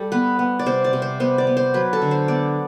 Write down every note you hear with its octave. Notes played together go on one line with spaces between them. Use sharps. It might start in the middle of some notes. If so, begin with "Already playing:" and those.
Already playing: G3 A4
B3 B4
B3
D5
C3 C5
D5
C3
C5
B3 C5
D5
B3
C5
F#3 B4
A4
D3
C5
B3 D5